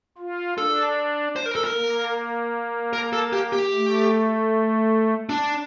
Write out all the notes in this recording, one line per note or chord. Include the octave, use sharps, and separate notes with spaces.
F4
D4 A4
C5
A#4
A4
A#4
A#3
A#4
A4
G4
G4
A3
D4